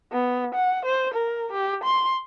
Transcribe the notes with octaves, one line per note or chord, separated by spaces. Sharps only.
B3
F#5
C5
A#4
G4
C6